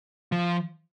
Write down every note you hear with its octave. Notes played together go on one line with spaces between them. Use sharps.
F3